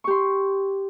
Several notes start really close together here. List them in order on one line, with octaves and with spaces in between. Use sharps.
C#6 G4 C6